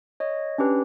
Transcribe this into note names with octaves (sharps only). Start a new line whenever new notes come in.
C#5 D#5
C#4 D4 G4 B4